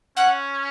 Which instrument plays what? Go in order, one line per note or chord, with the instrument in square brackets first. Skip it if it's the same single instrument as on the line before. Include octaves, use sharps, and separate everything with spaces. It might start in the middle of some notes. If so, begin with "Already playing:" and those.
[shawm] C#4 [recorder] F#5